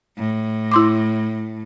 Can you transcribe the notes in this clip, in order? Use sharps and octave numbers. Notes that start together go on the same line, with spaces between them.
A2
E4 C6 D6